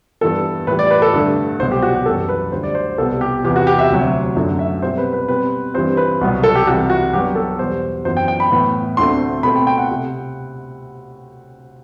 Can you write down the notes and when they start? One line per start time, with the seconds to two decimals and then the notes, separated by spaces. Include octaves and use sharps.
0.21 G2 E3 B3 A4
0.67 A2 E3 G3 B4
0.79 D5
0.91 B4
1.02 A4
1.13 G2 D3 A3
1.59 C2 B2 F#3 C5
1.72 G4
1.82 F#4
1.95 G4
2.06 F#2 E3 G3 A4
2.29 B4
2.52 D2 D3 G3 C5
2.63 D5
2.75 C5
2.98 C2 B2 G3 B3 A4
3.21 G4
3.44 E2 C3 E3 B3 G4
3.56 F#4
3.67 G4
3.79 E5
3.90 D2 C3 F#3
4.37 F#2 D3 A3
4.59 E5
4.82 B2 G3 C4 C5
4.98 B4
5.13 B4
5.28 B2 G3 C4 B4
5.74 G2 E3 G3 C4 C5
5.97 B4
6.21 C2 B2 F#3 B3
6.43 A4
6.55 G4
6.67 C2 C3 E3 F#4
6.90 F#4
7.13 G2 F#3 B3 G4
7.35 A4
7.59 E2 B2 G3 C5
8.05 F#2 E3 B3 C5
8.17 G5
8.28 G5
8.40 B5
8.51 A2 E3 B3
8.97 D2 D3 A3 C4 C6
9.43 B2 A3 C4 B5
9.55 G5
9.67 G5
9.78 F#5
9.91 C3